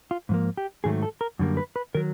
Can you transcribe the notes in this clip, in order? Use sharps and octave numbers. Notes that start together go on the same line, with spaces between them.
F4
G#2 F3 A#3
G4
G#2 D#3 F#3 A3 G#4
A4
A#4
F#2 D3 G3 A#3
B4
B4
D#3 F#3 A#4